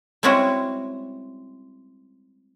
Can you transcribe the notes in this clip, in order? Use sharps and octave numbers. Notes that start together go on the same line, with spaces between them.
G3 G#3 C4 C#4 E4 F#4